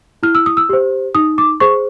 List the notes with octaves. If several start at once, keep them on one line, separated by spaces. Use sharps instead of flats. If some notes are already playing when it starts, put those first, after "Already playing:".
E4 F6
E6
D#6
E6
G4 C5
D#4 D#6
D6
G#4 C5 C#6